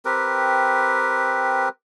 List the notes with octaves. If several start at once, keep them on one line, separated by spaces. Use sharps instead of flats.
C4 G4 A#4 B4